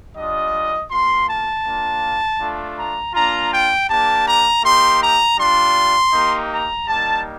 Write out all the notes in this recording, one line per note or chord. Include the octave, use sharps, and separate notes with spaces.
G3 D4 F4 D#5
A#3 F4 C6
A5
A#3 D4 F4
A3 D4 F4
A#5
A#3 D4 F4 A#5
G5
A#3 D4 G4 A5
A#5
A#3 D#4 G4 C6
A#5
G3 D4 F4 C6
A#3 D#4 G4
A#5
G3 A#3 D#4 A5